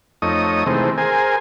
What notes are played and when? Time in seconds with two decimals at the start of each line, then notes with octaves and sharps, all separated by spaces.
0.22 F2 A3 D#4 C#5 D#5 D#6
0.66 C3 D#3 E3 G#3 A3 C4
0.98 G#4 A#4 C5 G#5